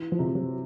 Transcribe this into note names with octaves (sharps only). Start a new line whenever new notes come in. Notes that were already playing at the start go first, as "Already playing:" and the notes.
Already playing: E3
F3
C3
F#3